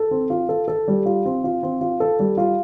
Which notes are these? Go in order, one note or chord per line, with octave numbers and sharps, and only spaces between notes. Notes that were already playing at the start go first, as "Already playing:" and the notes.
Already playing: A4
C4
F4
A4
A4
G3
F4
C4
F4
C4
F4
A4
G3
F4